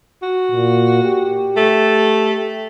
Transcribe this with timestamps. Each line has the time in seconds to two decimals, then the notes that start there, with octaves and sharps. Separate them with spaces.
0.22 F#4
0.51 A#2
1.04 G4
1.57 A3